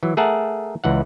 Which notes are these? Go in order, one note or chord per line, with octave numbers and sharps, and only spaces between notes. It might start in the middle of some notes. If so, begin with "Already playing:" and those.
E3 F#3
A3 G#4 A#4 E5 F#5 A5
C#2 E3 F#5